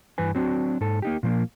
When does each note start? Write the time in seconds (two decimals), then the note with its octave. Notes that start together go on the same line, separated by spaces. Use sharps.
0.18 G2 E3 B4 G#5
0.35 F#3 C4 D4 F#4
0.81 G#2 A4
1.02 A#3 D#4 G4
1.23 A#2 F3 A#3